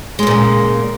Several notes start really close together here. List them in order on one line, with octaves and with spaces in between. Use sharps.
G#3 A#3 A#2 C#3